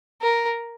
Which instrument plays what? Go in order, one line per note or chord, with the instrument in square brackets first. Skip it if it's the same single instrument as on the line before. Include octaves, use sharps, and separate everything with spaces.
[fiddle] A#4